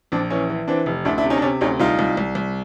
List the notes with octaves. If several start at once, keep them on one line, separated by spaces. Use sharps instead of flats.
A#1 C4 D4
E3 C#4
E3
E3 C4 D4
F1
D2 D4 E4
D4 E4
C3
C#4 D#4
D4
C3 C#4
D2 C#4 D#4
C2 D#4 F4
C2
C2
C2